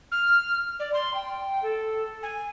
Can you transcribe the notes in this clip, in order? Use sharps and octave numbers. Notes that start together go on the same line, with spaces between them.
F6
D5
C6
G5
A4
G#5